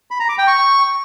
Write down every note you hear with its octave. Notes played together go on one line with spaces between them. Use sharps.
B5
A#5
D6
G5
C#6